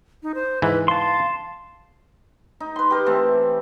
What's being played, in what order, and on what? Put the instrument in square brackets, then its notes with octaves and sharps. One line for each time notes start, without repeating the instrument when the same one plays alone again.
[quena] D#4
C5
[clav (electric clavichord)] G#2 E3 [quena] B4
[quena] F5 [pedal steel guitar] A5 C6
[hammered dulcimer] D#4
B4 C6
G4 A#4 B4
E3 A3 C4